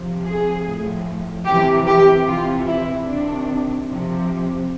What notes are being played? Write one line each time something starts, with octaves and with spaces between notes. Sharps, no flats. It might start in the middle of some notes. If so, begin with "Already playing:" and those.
Already playing: C3 F3
G#4
A2 F3
C3 E3 G4
G4
C3 E3 F4
E4
C3 D#3 D4
C3 F3